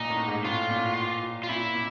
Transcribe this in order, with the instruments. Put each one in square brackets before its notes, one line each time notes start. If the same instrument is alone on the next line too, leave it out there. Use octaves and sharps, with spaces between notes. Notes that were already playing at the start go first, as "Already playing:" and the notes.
Already playing: [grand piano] A#2 [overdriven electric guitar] D#4
[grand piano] A2
G#2
[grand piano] A2 [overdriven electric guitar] F4
[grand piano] A#2
[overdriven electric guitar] F4
[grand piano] A#2 [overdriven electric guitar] E4
[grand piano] A#2